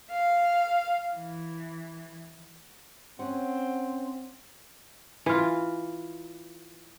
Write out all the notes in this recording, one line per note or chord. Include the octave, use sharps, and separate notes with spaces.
F5
E3
C4 C#4 F#5
E3 F4